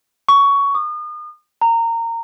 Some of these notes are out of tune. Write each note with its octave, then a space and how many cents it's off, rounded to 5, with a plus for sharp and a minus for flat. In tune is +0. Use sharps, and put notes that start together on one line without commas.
C#6 +15
D#6 -40
A#5 -20